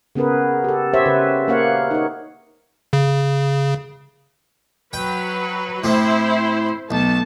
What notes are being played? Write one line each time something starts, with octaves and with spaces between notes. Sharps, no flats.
C#3 B3 C#4 G#4 A#4 B4
G4 A4
G4 C5 C#5 E5
C#3 C#4 B4
A#3 C#4 C#5 F5 F#5
D#4 C#5
C#3
F#3 B4 G5
A2 C4 E4 C5
B1 A3 A5